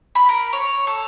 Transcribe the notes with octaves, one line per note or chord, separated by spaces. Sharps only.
B5
A#4
C#5
A4